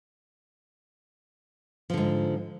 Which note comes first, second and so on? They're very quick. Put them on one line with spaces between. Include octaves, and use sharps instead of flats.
F3 D3 G#2